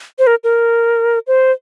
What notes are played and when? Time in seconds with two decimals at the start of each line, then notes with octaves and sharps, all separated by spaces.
0.19 C5
0.27 A#4
0.44 A#4
1.27 C5